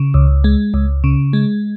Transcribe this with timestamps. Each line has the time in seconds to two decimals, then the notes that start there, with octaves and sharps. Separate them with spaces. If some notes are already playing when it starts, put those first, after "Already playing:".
Already playing: C#3
0.14 C#2
0.44 G#3
0.74 C#2
1.04 C#3
1.33 G#3